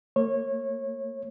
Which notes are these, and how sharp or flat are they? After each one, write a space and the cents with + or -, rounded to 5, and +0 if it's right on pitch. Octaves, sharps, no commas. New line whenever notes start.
A#3 -35 C#5 -25